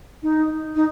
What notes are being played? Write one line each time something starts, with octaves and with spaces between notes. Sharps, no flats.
D#4
D#4